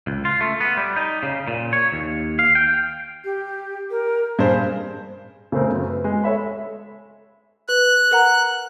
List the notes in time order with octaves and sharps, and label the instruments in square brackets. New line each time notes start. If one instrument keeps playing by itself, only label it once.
[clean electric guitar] C#2
F4
A3
B3
G3
D#4
C#3
A#2
C#5
D#2
F5
G5
[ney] G4
A#4
[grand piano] G2 C5 [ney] G#4
[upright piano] C#3 A3 C4 A#4
F#2
B4
G#3
A4 C#5 E5 B5
[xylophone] B4 [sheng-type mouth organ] F#6
[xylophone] A#4 F#5 A#5